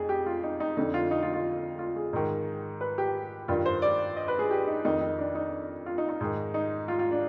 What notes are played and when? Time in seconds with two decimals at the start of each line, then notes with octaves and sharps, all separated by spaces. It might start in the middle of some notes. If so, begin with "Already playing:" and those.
Already playing: F2 D#4 G#4
0.09 G4
0.26 F4
0.43 D#4
0.60 D#4
0.77 F2 D3 D#4
0.94 F4
1.11 D#4
1.23 F4
1.33 F4
1.79 F4
1.96 G#4
2.13 G#2 D#3
2.81 B4
2.98 G4
3.48 G2 D#3 F4
3.66 C5
3.82 D5
4.17 D#5
4.28 B4
4.39 G#4
4.51 G4
4.67 D#4
4.85 F2 D#3 D#4
5.01 D#4
5.18 D4
5.35 D#4
5.86 F4
5.98 D#4
6.09 D#4
6.21 G#2 D#3
6.54 D#4
6.88 F4
6.99 F4
7.11 D4